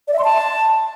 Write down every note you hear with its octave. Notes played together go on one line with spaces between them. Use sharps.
D5
E5
C6
A5